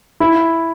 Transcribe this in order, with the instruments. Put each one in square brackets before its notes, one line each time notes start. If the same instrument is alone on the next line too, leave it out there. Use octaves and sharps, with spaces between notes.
[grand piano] E4